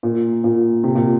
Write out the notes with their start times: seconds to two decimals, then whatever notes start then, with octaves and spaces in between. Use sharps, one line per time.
0.03 A#2
0.44 A#2
0.84 C3
0.95 A#2